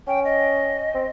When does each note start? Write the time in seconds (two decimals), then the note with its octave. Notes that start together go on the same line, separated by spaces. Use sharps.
0.07 C#4 G5
0.24 D#5
0.95 C4